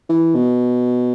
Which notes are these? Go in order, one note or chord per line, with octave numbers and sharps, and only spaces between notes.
E3
B2